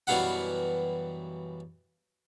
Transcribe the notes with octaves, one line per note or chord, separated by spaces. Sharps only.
F#2 B2 E3 G3 F5 F#5